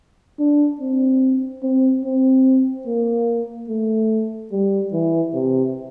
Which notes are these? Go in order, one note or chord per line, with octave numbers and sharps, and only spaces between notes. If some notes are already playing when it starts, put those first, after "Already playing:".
D4
C4
C4
C4
A#3
A3
G3
E3
C3